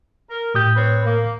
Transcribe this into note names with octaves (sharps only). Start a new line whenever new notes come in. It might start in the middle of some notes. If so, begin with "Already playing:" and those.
A#4
A2 G4 D#6 G6
C4 B4 C#5
A#3